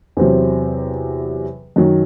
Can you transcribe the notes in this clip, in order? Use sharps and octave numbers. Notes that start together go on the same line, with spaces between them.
E2 C3 F#3 C4
F#2 D#3 F#3